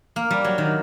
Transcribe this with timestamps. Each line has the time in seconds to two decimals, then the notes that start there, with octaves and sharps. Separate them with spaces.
0.16 A#3
0.31 G3
0.44 F#3
0.58 D#3